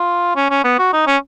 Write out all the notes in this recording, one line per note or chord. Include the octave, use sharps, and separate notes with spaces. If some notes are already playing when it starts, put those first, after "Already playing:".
Already playing: F4
C#4
C#4
B3
F#4
D#4
C#4